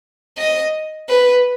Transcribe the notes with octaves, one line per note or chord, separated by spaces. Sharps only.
D#5
B4